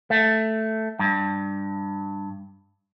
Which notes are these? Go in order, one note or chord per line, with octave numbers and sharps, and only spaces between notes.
A3
G2